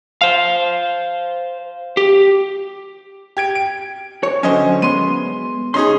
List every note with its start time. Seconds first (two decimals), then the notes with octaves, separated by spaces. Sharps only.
0.22 C5 F5
1.97 G4
3.37 G4 G#6 D7
3.55 D7
4.23 C#5
4.43 D3 F#3 C#4 C5 D#5 G#5
4.82 G#3 B3 C6 D#7
5.74 C#2 C#4 D#4 G#4 C6